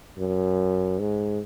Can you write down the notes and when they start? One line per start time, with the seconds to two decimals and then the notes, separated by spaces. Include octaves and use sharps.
0.19 F#2
0.99 G#2